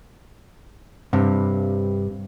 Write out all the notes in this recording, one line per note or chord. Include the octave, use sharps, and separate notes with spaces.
G2 C3